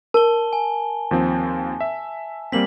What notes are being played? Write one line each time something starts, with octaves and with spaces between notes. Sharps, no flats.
A#4 A5 G7
G#5
D#2 F3 C4
E5
G3 A#3 C4 B6 F#7